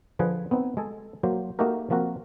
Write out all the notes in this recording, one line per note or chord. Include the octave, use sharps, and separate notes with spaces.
D3 F3 G#4 B4
B3 C4 D#4
G#3 G#4 A4
F#3 A#3 C5
A3 A#3 D#4 F#4 G4 A#4
F3 A#3 C4 F#4 A#4